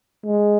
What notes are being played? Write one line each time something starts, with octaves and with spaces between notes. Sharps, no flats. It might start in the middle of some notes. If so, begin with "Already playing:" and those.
G#3